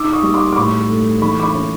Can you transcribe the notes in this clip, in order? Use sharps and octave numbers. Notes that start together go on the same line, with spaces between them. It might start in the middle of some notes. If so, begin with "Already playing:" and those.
Already playing: D#4 D6 E6
C#6 D#6
G3
C6 D6
D6
A2 B5 C#6
A3
E3 B5 C#6
D6
B5 C#6
C#4